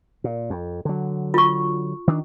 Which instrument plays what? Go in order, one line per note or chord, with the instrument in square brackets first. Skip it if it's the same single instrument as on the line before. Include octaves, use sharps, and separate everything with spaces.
[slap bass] A#2
F2
D3 F#3
[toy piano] F4 C#6
[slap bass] D#3 D4